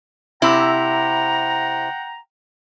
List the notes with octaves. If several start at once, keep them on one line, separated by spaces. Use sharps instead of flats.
C3 E4 F#5 G5 A#5